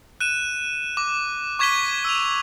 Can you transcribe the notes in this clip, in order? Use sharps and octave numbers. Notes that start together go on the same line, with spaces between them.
F#6 D#7 E7
D6
C#6 D6 G#6 B6 D#7 G7
E6 D#7 F7